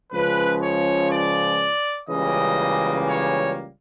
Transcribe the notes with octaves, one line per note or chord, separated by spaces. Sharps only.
C#2 C#3 F3 B4
C#5
D5
C#2 C#3 E3 G3 A#3 D#5
C#5